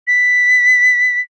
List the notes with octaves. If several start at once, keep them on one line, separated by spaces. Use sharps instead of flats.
B6